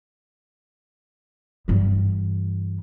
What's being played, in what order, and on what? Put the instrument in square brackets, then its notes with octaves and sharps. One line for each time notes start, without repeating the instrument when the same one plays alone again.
[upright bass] G2 E3